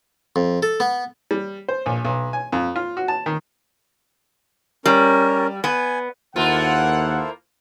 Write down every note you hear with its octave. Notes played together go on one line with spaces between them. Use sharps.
F2
A4
B3
G3
C5
A#1
B1
G#5
F2
F4
F#4
A5
D#3
G3 C#4 A#4
B3 G#5
D#2 A#3 E4 F4 A4 C5 F#5